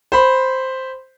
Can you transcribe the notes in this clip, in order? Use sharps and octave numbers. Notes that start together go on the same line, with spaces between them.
C5 B5